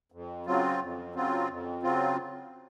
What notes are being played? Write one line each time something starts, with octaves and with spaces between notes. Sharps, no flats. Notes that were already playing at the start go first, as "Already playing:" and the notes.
F2
C#3 F#3 C4 F4
F2
C#3 F#3 C4 F4
F2
C#3 F#3 C4 F4